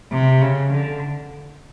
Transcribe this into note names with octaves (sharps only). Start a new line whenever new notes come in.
C3
C#3
D3